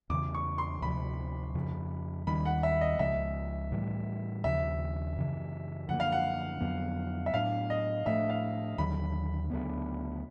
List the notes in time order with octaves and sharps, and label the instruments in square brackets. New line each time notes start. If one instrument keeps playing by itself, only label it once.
[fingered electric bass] E2 C#3 E3 [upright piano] D6
[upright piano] C#6
C6
[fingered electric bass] D2 C3 F3 [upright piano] B5
[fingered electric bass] F2 C#3 F3
[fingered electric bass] D#2 D#3 G3 [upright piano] B5
[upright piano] F#5
E5
D#5
[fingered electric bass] C#2 C#3 F3 G#3 [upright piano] E5
[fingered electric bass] A2 E3 G3
[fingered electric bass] D#2 C#3 F3 [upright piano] E5
[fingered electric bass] F#2 C#3 E3
[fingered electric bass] F#2 D3 F3 A#3 [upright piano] F#5
[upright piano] F5
F#5
[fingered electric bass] F2 D3 F#3 B3
[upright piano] E5
[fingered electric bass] A2 F#3 B3 D4 [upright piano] F5
[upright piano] D#5
[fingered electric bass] A2 F3 A3 D4 [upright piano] E5
[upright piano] F5
[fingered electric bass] D#2 D3 F#3 [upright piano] B5
[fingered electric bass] D2 C#3 F#3 B3